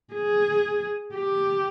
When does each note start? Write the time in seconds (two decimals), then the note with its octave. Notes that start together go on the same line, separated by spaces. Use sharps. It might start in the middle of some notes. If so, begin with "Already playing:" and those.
0.14 G#4
1.15 G4